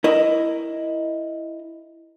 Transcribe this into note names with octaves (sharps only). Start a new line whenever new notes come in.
E4 A#4 D#5